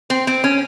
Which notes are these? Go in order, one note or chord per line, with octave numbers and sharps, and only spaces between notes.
C4
C4
C#4